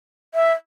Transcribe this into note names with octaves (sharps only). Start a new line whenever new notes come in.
E5